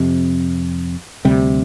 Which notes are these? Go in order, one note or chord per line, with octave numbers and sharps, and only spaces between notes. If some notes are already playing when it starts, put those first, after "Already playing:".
Already playing: F2 C3
D2 C3 G3